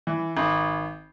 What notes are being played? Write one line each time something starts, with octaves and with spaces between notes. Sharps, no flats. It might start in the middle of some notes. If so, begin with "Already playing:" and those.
E3
G#1